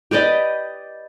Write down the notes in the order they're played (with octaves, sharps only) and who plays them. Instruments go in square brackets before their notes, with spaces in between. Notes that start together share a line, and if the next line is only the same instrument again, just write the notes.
[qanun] G4 B4 D5 D#5